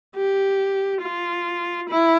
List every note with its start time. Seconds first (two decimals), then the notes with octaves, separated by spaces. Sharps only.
0.16 G4
1.02 F4
1.89 E4